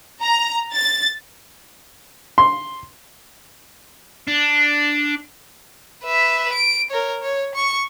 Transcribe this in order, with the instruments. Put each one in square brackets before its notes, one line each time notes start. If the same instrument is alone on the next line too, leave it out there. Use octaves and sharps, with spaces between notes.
[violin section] A#5
A6
[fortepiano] C6
[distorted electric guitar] D4
[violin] B4 E5
D7
A#4 C#5
C#5
C#6